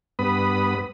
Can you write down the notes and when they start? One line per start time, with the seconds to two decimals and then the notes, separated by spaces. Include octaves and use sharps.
0.19 G2 B3 B4 B5 D#6